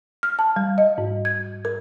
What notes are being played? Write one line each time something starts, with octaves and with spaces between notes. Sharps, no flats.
F6
A5
G3
D#5
G#2
G#6
A#4